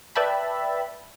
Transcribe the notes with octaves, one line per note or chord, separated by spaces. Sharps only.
B4 D5 E5 G5 A5 B5